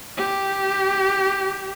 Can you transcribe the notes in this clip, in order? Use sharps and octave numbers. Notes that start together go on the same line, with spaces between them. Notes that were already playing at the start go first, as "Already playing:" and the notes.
G4